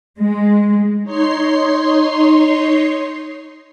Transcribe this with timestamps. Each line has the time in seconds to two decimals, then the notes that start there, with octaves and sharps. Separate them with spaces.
0.20 G#3
1.03 D#4 C#5 C6 C7